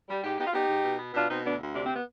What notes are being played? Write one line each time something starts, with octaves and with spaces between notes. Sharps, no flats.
G3
G#2 D#4 G4
B3 D#4 G4
F4
B3 D#4 G4
G#2
B2
B3
B2 D4 F4
B2 C4 D#4
D2 B3 D4
D2
C3 D4
C4
B3